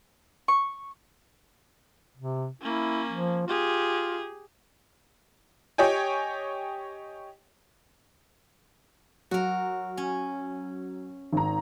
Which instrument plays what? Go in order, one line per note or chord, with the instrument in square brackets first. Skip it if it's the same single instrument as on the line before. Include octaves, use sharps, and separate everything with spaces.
[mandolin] C#6
[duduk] C3
[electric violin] A#3 C#4 [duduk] E4
[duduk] F3
[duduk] F4 [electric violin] G4 G#4
[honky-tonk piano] G4 C#5 D#5 G5 G#5
[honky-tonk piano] F#3 [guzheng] F#4 A#4
[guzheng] C#4
[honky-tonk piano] G#1 A#5